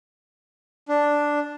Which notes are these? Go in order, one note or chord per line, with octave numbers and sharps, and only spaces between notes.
D4